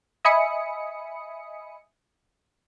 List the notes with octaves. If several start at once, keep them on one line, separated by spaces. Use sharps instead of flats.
D#5 E5 G#5 B5 D#6 C#7